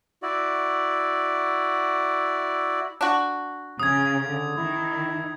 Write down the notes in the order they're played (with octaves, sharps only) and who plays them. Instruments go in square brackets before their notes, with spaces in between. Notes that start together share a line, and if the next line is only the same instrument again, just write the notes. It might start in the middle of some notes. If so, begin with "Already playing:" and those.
[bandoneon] E4 F#4 D5
[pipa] D4 F#4
[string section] C#3 [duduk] C#4 [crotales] D#6 G#6
[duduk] D3
[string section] D#3 [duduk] E4